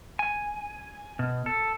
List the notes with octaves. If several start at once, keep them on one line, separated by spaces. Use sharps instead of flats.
G#5
B2
A4